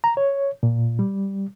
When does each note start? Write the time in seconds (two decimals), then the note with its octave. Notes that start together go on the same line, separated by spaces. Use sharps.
0.04 A#5
0.17 C#5
0.63 A#2
0.99 G3